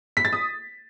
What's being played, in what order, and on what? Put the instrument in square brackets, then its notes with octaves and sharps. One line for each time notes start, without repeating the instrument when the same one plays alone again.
[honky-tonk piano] B6
A6
D#6